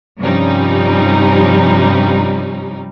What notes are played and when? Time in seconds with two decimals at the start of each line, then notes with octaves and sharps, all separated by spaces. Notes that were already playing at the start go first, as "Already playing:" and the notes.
0.20 G2 C3 F3 G3 C#4 D#4